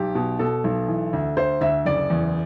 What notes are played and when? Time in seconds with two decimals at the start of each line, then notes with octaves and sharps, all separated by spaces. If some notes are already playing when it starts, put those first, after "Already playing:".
Already playing: B1 G4
0.15 B2
0.39 B2 A4
0.64 B1
0.88 E3
1.13 D2
1.37 D2 C5
1.61 D2 E5
1.85 F#1 D5
2.10 E2